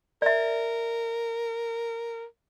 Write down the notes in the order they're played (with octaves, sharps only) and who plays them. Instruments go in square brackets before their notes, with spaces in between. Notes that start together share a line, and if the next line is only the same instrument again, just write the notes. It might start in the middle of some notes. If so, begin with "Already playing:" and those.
[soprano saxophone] A#4 [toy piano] D5 E5